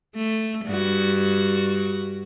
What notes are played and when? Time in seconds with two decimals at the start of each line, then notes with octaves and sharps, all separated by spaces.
0.16 A3
0.66 G2 F#4